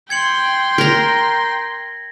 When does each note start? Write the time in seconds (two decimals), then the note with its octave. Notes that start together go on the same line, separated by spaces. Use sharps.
0.10 G5 C6 G#6 C#7 F#7
0.78 A#4 A#5 A#6 B6